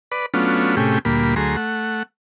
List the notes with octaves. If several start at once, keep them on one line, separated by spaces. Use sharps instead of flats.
B4 D5
F#3 A3 B3 C#4 D4 F4
A2 C3 A3 C#4 G4 G#4
D2 A#2 G3 A#3 B5
D2 F#3 A3 G#4 A#5 C6
A3 F#5